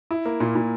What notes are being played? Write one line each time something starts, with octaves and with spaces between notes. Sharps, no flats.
E4
A#3
A#2
A#2